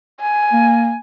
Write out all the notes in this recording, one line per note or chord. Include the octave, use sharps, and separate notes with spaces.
G#5
A#3